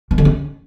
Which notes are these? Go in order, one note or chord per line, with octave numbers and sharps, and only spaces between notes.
E3
D3
C#4